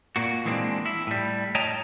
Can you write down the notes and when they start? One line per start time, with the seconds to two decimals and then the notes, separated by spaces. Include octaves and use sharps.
0.16 A#2 A#3 F#4
0.45 E3 G#3 A#3 C4 D4
0.86 E4
1.07 A2 G3
1.55 C#5 D#5 G5 A5 A#5